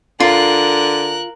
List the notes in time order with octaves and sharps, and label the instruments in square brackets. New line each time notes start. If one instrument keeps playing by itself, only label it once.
[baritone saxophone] D3 [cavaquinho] F4 [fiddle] A#4 F#6